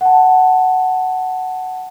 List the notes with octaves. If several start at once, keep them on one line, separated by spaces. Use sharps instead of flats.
F#5 A5